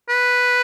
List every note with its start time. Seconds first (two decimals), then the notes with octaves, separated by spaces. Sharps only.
0.09 B4